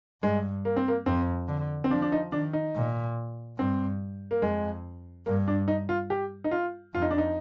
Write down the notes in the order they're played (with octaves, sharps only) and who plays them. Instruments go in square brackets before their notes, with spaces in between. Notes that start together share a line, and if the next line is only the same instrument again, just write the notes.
[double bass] G2 [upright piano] G#3
[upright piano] A#3
C4
A#3
[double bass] F2 [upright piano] C4
[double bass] D3
[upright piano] C4
[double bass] F3 [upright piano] D4
[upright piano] D4
D#4
[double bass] D#3 [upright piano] D4
[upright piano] D#4
[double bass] A#2
[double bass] G2 [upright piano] C4
[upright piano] A#3
[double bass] F2 [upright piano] G#3
[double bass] G2 [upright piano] A#3
[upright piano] D4
D#4
F4
G4
D#4
F4
[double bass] F2 [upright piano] F4
[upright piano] D#4
D4
D#4